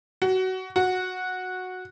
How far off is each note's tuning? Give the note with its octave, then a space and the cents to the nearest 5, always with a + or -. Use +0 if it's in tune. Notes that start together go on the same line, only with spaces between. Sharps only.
F#4 +20
F#4 -10